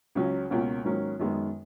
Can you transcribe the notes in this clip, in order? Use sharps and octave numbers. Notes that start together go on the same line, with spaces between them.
C#2 C#3 F#3 C#4
C#2 B2 A#3 C#4 F#4
G#2 D#3 F#3 A#3 C#4
F#2 D#3 G#3 B3